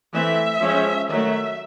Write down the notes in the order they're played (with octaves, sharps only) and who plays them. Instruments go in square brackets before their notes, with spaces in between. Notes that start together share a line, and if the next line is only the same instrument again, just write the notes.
[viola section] E3 A3 C4 E5
F3 G#3 C#4
D#3 F#3 A3 E5